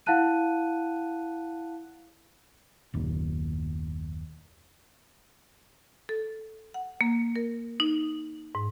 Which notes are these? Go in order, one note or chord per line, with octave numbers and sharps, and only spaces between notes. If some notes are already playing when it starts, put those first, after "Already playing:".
E4 F5 F#5 A5 F#6 D#7
F#1 D#2 A#2
A4
F#5
A#3
A#4
D#4
G#2